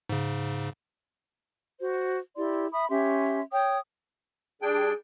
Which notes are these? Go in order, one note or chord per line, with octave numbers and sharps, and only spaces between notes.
G#2 C#3
F#4 C5
E4 G4 D5 C6
E5 B5 D#6
C#4 G4 E5 C6
C#5 G5 D#6
G3 D4 G#4 G5